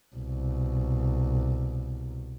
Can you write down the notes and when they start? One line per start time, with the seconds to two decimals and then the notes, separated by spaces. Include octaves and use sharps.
0.15 C2 B2